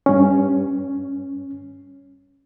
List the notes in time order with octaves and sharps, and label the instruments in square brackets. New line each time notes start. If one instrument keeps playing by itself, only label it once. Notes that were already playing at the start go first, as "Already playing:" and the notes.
[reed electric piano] G2 C#4